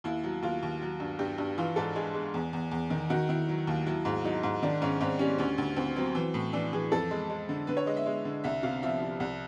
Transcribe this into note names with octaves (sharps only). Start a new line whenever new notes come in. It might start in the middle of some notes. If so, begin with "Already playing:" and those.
D#2 E4
F#3
D#2 F4
D#2
F#3
G2
G2 G4
G2
E3 F4
G#2 A4
G#3 G#4
G#3
E2
E2
E2
D#3
D#3 F#4
D#3 E4
F#3
D#2
F#3 E4
G#2
F#3 D#4
G#2
D#3 D4
G#2 C#4
G#2 C4
G3 C#4
D2 C#4
D2
D2 C4
F#3 C4
E3
A2
E3 D4
E3 G#4
F2 A4
G#3
G#3
D3
D3 B4
C#5
G#3 D#5
E5
G#3
D3
C2 E5
C3 F5
F3 E5
F3
C2